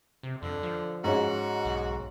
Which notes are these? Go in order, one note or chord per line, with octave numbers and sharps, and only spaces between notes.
C3
F2 D3
F3
G#2 C#4 F#4
B1